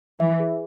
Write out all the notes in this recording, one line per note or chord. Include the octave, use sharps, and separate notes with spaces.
E3 E5
G#4